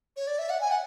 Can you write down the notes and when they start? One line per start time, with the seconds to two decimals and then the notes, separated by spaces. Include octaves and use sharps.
0.16 C#5
0.27 D5
0.39 E5
0.50 F#5
0.61 G#5
0.71 F#5